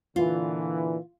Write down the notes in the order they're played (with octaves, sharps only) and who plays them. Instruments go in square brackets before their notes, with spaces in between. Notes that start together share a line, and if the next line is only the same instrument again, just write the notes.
[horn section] A#2 D3 E3 [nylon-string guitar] F4